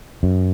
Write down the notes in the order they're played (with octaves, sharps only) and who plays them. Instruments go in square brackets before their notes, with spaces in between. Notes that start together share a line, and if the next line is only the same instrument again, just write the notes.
[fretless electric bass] F#2